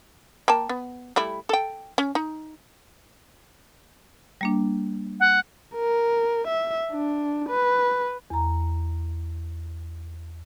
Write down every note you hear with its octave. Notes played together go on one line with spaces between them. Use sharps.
A#3 G5 A5
B3
G3 A3 E4
A4 G5
C#4
D#4
G3 A#3 D4
F#5
A#4
E5
D4
B4
E2 A#5